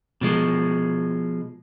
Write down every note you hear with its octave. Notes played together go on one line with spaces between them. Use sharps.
B2 F3 G#3